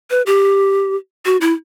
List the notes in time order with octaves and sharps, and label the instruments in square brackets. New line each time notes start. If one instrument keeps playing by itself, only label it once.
[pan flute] B4
G4
F#4
E4